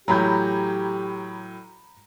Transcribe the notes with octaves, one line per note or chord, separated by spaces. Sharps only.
A2 E3 F#3 G4 A#5 B5 G6